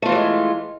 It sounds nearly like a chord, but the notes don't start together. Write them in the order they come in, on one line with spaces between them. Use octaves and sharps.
A3 F4 E3 F#3 G#3